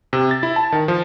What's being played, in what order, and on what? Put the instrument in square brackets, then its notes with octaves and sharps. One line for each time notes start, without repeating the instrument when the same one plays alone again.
[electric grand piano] C3
A6
E4
A5
D#3
F3